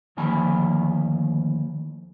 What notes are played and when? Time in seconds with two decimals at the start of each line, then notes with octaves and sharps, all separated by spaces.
0.17 D2 D#3 F3 A#3 G#5 B5